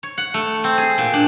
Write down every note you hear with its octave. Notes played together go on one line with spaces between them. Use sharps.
C#5
F#5
A3
C4
G#4
A#2
D4